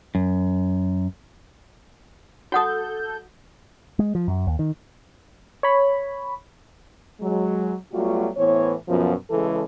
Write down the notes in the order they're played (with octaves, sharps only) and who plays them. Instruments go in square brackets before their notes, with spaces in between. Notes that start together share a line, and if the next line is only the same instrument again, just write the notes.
[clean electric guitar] F#2
[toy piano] F#4 F#5 D#6 [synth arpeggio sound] A4 G6
[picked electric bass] G#3
F3
F#2
D#2
D#3
[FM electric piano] C#5 B5
[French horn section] F#3 G#3
F#3 G3 A3 B3 F4 F#4
A2 E3 B3 C5 C#5
F#2 B2 F3
C#3 E3 G#3 A4